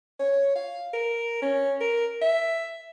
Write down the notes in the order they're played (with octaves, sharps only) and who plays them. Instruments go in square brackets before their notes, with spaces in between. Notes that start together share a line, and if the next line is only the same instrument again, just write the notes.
[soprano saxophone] C#5
F5
A#4
C#4
A#4
E5